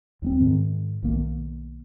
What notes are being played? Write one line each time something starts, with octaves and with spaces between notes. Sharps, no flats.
D#2 G#3 C4
G#2 D#3
B1 D#3 A#3